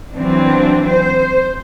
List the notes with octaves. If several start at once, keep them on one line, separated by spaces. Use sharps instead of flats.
E3 F#3 C4 D4
C5